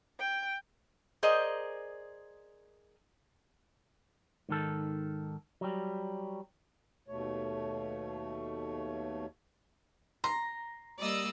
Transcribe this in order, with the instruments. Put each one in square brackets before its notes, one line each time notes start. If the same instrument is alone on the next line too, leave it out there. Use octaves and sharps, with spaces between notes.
[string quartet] G5
[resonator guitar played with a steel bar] G#4 A#4 C5 D5 D#5
[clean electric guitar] G#2 D#3 A4
F#3 G3
[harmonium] D#2 B2 A3 C#5
[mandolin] A#5 [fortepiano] C6
[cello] G3 A#3 [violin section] D5 D#5 E6